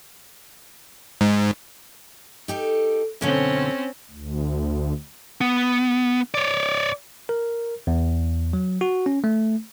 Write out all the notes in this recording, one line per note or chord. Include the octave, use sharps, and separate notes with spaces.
G#2
D#4 G4 A4
F#2 B2 D3 C4 C#4
D2
B3
C#5 D5
A#4
E2
F#3
F#4
C#4
A3